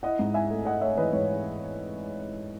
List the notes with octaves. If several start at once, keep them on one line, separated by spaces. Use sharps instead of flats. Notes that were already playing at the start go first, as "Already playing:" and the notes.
E4 D#5 F#5
G#2
E4 E5 G#5
A3
E4 D#5 F#5
A3 C#5 E5
E3 B4 D#5
G#2 C#5
E4